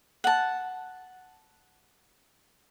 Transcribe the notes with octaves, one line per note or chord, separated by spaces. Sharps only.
F#5 A5